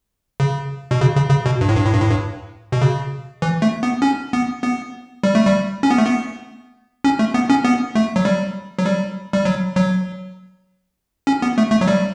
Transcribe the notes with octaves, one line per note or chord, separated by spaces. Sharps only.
C#3
B2
C#3
C#3
C#3
B2
G2
A2
G2
A2
G2
A2
G2
B2
C#3
E3
A3
B3
C#4
B3
B3
G3
A3
G3
C#4
B3
A3
B3
C#4
A3
B3
C#4
B3
A3
F#3
G3
F#3
G3
G3
F#3
F#3
C#4
B3
A3
A3
F#3
G3